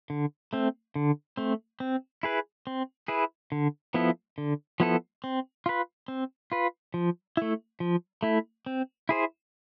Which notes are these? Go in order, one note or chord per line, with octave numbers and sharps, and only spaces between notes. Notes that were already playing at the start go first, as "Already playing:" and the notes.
D3
A3 C4
D3
A3 C4
C4
E4 G#4 B4
C4
E4 G#4 B4
D3
F3 B3 E4 A4
D3
F3 B3 E4 A4
C4
F4 B4
C4
F4 B4
F3
A3 E4
F3
A3 E4
C4
E4 G#4 C5